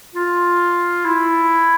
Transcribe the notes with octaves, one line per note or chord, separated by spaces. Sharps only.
F4
E4